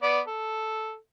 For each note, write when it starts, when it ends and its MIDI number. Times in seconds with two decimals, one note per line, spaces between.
0.03 0.20 59
0.03 0.20 74
0.27 0.96 69